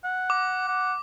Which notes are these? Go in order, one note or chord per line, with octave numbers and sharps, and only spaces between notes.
F#5
D6
F#5